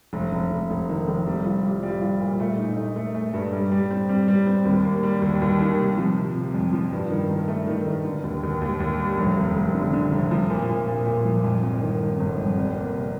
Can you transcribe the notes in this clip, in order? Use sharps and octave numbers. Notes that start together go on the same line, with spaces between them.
F1
F1
F1
F1
D#3
F1
G3
F4
G3
G3
F4
A#2
A3
D#4
D#4
A3
A3
G2
G3
G3
C4
G3
G3
C4
D#2
A#3
G3
D#2
D#2
D#3
C3
F3
C3
C3
F2
F3
G2
D#3
D#3
A3
D#3
D#3
D3
D#2
D#2
D#2
D#2
G3
F1
D#2
F1
D3
D3
F1
F3
A#2
A#2
A#2
A#2
F3
F2
G1
D#3
D#3
G1
F2
C2
A#3
C3